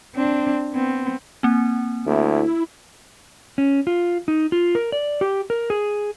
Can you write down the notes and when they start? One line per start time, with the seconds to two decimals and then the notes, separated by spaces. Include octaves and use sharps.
0.16 C4 D4
0.73 B3 C4
1.43 A#3 C4
2.06 D2 E4
3.58 C#4
3.87 F4
4.28 D#4
4.52 F4
4.75 A#4
4.92 D5
5.21 G4
5.50 A#4
5.70 G#4